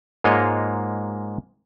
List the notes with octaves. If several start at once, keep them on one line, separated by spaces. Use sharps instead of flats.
G#2 G#3 A#3 F4 C#5 D#5